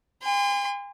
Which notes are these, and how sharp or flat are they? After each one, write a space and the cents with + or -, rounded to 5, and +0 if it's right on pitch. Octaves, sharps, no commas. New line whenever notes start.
G#5 -45 C6 -30